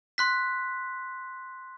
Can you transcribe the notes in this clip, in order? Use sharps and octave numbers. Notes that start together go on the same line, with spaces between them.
C6 F#6 B6